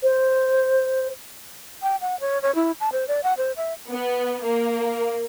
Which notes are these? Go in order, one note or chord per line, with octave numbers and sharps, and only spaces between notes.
C5
G5
F#5
C#5
C#5
E4
A5
C5
D5
F#5
C5
E5
B3
A#3